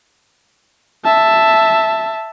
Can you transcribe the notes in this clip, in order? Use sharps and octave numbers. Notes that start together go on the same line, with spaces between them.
E5 A5